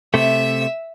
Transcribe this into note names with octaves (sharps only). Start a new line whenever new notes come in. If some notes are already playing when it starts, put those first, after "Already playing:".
C3 A3 E5 E6